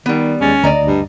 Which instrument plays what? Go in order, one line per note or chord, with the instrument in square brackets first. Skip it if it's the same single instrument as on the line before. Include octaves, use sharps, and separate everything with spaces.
[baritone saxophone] D#3 [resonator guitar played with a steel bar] G3 B3
[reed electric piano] D#2 G#3 A6 [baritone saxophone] C#4
[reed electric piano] D2 [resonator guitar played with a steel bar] D5 D#5 A#5
[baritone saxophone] G2